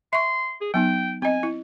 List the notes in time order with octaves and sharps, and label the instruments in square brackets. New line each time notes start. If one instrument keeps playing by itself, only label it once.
[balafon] E5 C#6 [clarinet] C6
[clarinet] G#4
[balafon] F#3 B3 D#4 [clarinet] G5
[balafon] C4 D#5 [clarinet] G#5
[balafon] E4